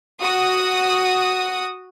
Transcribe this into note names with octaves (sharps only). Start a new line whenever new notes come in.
F#4 D#6